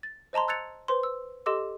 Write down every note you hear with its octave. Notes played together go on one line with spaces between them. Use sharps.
A6
C5 D#5 A5 A#5 C6
E6 F#6 G#6 A6 C#7 F7
B4 C5 C6
E6
G4 A4 D#5 C6 D6 E6